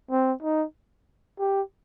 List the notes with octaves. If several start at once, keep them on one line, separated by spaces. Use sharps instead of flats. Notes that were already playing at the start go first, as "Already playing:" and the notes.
C4
D#4
G4